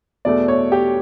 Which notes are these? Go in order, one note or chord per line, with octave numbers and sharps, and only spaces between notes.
E2 B2 A3 D5
C#5
G4